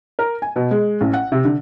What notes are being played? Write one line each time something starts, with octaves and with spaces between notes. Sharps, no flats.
A#4
G#5
B2
G#3
A1
F#5
C3
D3